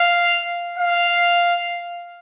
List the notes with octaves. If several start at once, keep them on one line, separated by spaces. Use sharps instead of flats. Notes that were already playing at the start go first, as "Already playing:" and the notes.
Already playing: F5
F5